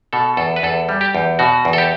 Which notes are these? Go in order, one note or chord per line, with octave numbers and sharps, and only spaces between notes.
B2 A4
E2 A4
B4
E2 A4
G3
G4
E2
B2 F#4
E2
A4
G4